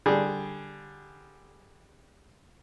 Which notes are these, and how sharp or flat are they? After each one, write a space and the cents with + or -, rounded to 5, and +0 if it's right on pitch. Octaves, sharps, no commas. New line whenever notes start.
D3 +0 G3 +0 G#4 +0